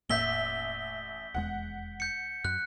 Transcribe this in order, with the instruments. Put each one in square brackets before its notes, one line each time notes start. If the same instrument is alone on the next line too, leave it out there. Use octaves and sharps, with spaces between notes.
[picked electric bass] E1 A2 A#3 [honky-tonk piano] A1 E5 [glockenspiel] G6 B6 G7
[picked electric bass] D#1 E2 G#3 [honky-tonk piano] F#5
[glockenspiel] G6 C#7
[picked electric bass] F#2 [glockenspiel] F#6